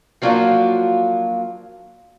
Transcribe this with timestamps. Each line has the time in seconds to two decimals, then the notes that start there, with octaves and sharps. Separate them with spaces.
0.22 F3 F#3 A#3 D4 F4 F#4